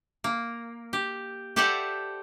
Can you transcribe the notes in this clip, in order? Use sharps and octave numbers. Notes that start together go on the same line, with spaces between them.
A#3
G4
G4 A4 C5 D5 E5 F#5